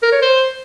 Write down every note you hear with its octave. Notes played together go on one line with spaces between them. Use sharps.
A#4
C#5
C5